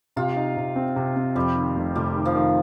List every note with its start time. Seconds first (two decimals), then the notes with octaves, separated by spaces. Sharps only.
0.16 C3 F4
0.36 D#4
0.57 C3
0.76 C4
0.96 C3
1.16 C4
1.36 F2 G3
1.56 D#3
1.76 F1
1.96 F1 G3
2.16 D#3
2.25 F3
2.35 D#3